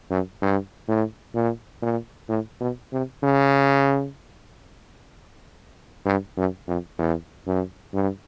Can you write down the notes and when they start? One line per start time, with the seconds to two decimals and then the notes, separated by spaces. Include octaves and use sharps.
0.10 F#2
0.42 G2
0.88 A2
1.35 A#2
1.82 A#2
2.29 A2
2.60 B2
2.93 C3
3.23 C#3
6.06 G2
6.37 F#2
6.67 F2
6.99 E2
7.46 F#2
7.93 G2